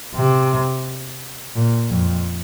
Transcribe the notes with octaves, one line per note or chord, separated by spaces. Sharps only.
C3
A#2
F2